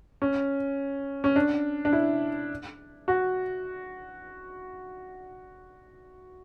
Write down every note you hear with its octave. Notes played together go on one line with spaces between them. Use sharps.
C#4
C#4
D4
D4
E4
F#4